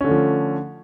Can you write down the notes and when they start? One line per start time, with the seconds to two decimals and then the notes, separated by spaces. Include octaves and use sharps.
0.01 C#4
0.04 D3
0.08 A3
0.11 F3